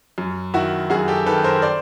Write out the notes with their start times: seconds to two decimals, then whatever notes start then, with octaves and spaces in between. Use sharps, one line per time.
0.18 F#2
0.54 D#3 E4 F#4
0.90 F#2 F#4 G#4
1.08 G4 A4
1.26 D#3 A4 B4
1.44 A#4 C5
1.62 C5 D5